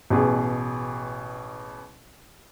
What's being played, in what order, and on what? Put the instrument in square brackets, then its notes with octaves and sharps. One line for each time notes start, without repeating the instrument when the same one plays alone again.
[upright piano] A1 B2 G#4